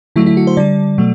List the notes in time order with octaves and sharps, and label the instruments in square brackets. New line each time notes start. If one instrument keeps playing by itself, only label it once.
[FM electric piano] D3 F#3 A3 E4
E4
F#4
C5
D3 G3 D5
B2 F#3 A3